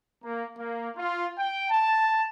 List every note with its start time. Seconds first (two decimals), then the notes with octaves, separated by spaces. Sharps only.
0.23 A#3
0.58 A#3
0.97 F4
1.38 G5
1.70 A5